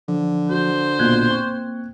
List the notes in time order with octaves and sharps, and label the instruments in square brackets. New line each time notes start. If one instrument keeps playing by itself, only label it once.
[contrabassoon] D3 [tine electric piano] F3
[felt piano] F#4 [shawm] C5
[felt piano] A#1 B2 [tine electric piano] A#3 F#6 G#6
[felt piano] C4 C#6